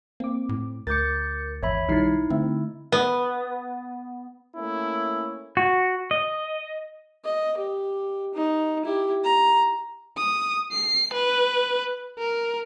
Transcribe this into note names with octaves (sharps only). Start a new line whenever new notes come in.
A#3 C4 D6
A2
D2 A#4 D6 G6 A6 C#7
G#1 E2 C#5 E5 B5
B1 D#3 G3 D#4 E4 C7
D3 A3 C4 E5
B3
A3 A#3 C#4 E4
F#4
D#5
D#5
G4
D#4
E4 G4
A#5
D#6
C7
B4
A#4